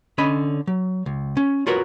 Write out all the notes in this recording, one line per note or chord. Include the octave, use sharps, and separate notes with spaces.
D3 C#4 D#5 B5
F#3
C#2
C#4
F4 F#4 A#4 B4 C#5